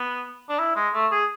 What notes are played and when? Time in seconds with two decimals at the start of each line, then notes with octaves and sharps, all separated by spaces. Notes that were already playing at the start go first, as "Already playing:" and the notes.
Already playing: B3
0.49 D4
0.59 E4
0.76 G#3
0.94 A3
1.11 G#4